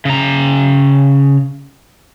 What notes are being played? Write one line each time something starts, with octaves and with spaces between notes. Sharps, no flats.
C#3 A#5